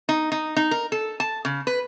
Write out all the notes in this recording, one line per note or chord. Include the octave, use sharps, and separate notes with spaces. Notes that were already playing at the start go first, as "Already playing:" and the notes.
D#4
D#4
D#4
A#4
A4
A5
C#3
B4